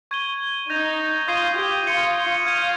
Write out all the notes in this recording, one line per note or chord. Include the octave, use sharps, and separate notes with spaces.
C#6 G#6 D#7 G7
D#4 G6 A#6 F7
F4 D#6 G#6 C7 D#7 G7
G4
F4 G#6 C#7 G7
F4 F6 G#6 D#7